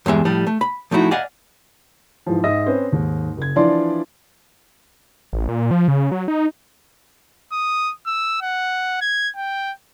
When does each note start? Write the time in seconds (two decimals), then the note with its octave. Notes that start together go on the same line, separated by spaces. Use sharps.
0.06 E2 G2 G#3 E5
0.25 A2 F3 G3
0.47 A3
0.61 B5
0.91 F3 A3 D#4 E4 F#4
1.11 D5 D#5 F5 F#5 G#5
2.26 G#2 E3 F3
2.44 G#2 D#5 E5 D#6 A#6
2.66 C4 C#4 B4 C5
2.92 D#2 G#2
3.37 F#1 G#6
3.56 E3 F3 D4 F4 D5 C6
5.33 A1
5.48 A#2
5.71 F3
5.88 C#3
6.12 F#3
6.28 D#4
7.52 D#6
8.06 E6
8.42 F#5
9.01 G#6
9.36 G5